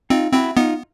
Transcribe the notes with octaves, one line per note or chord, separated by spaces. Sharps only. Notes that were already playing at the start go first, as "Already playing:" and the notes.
C4 D#4 F4
C4 E4 F#4
B3 D#4 F4